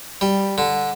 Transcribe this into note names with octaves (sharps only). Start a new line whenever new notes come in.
G3
D3